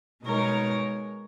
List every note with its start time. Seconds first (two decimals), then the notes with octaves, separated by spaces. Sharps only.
0.24 B2 G#3 D#4 A#4 C#5